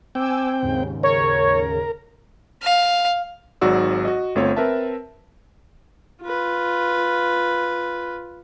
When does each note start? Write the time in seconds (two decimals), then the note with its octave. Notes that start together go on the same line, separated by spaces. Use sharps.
0.15 C4 G5 G#5 D6 E6
0.62 D#2 G#2 C#3
1.03 A#4 C#5
2.62 F5
3.61 G#1 G#2 F#3 F#4 D5 E6
4.05 F#4 D#5
4.35 G1 A3 C4 F4 C#5
4.56 C4 A#4 B4 E5 A5
6.22 F4 B4